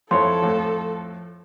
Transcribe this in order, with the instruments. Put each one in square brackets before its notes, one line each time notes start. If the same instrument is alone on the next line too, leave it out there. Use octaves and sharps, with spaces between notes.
[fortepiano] F2 E4 C#5 [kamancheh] A4 [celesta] C6
[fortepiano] F2 A2